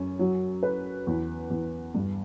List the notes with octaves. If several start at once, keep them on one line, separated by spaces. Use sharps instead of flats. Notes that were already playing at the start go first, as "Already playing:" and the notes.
Already playing: F#2 C#4
F#3
B4
E2
E2
G2